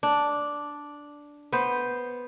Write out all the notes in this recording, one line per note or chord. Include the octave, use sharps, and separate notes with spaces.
D4
B3 C5